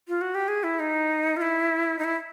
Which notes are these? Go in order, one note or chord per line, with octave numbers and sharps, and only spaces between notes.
F4
F#4
G4
G#4
E4
D#4
F4
E4
D#4
E4